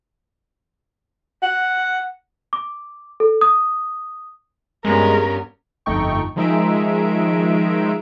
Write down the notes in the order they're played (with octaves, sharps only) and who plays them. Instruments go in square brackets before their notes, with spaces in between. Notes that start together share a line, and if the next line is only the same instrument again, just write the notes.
[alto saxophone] F#5
[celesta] D6
A4
D#6
[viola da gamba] G2 B3 C#4 [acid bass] G#3 [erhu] A#4
[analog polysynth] G1 F2 A3 D#4 G5 C#6
D#3 F3 G#3 D#4 E5 D7